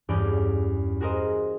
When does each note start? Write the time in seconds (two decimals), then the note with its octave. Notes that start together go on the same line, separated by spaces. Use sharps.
0.09 E2 G2 C#4 G#4 D5 G6
1.01 F#4 G#4 A#4 C5 D#5